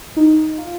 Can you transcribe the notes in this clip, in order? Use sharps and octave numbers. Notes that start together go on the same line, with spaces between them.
D#4
F4